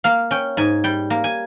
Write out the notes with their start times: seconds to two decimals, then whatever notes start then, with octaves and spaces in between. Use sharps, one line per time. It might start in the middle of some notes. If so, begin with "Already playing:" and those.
0.04 A#3 F5
0.31 C#4 G5
0.57 G#2 G#5
0.84 G3 G5
1.10 A#3
1.24 G#5